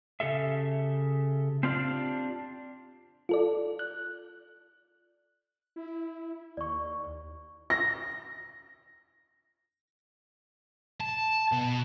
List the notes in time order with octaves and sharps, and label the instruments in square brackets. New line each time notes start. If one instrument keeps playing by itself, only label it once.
[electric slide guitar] C#3 G4 A4 E5
C4 D4 F4 G4 D5
[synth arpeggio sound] F4 A4 D5
F#6
[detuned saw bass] E4
[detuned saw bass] D#2 [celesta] D5 C#6
[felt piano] A#6
[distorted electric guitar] A5
B2